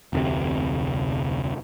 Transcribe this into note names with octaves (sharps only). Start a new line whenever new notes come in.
F1 D2 C3